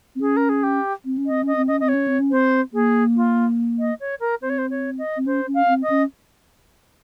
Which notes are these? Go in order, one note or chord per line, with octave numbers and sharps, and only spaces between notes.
C4
C#4 G#4
A#4
G#4
G4
C4
C#4
C4 D#5
C#4 D#5
C4
C#4 D#5
C4 D#5
C#5
C#4
C4
C#4
C4 C5
A#3 G#4
F4
D#5
C#5
A#4
C4 C5
C#5
C5
C#5
D#5
C4
C#4 C5
C#4
F5
C4
D#5
C#4